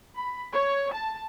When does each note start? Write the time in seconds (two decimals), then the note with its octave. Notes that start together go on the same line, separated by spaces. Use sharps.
0.16 B5
0.53 C#5
0.92 A5